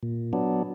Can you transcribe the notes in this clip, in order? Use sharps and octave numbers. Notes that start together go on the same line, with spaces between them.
A#2
F#3 B3 D4